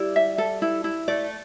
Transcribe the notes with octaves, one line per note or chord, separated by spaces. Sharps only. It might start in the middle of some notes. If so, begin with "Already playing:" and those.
Already playing: G3 E4
E5
A4
E4
E4
A3 D5